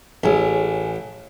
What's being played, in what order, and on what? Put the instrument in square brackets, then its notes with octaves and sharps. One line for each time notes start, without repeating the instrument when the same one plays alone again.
[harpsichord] A1 [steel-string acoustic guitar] G#4 C#5